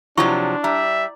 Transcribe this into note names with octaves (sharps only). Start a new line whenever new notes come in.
C3 F3 F#3 D4 E4 C#6
G3 E5 A#5